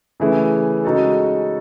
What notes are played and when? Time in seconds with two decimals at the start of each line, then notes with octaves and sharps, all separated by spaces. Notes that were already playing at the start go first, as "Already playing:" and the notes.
0.20 C#3 E3 A3 E4 G#4
0.85 C#3 G#3 D#4 F#4 A4